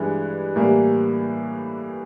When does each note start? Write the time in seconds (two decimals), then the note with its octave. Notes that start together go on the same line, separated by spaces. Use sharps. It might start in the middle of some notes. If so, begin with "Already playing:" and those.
Already playing: G2 E3 G#3
0.56 A2 E3 G3 A#3